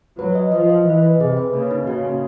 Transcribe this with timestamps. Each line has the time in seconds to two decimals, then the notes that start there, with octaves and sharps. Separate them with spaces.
0.19 F#3 B4
0.35 D#5
0.52 F3 D#5
0.70 D#5
0.86 E3 D#5
1.02 B4
1.20 C3 G#4
1.37 B4
1.53 C#3 A#3
1.71 D#4
1.87 C#3 F#4
2.05 A#3